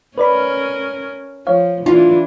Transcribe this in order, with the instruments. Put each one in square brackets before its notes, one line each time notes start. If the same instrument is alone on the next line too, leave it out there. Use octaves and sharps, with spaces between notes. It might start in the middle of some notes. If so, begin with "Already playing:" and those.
[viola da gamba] C#4 A#4 [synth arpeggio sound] B4 D5 B5
[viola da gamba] F3 [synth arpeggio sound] C#5 F5
[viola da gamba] E3 D4 [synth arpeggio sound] E4 [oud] F4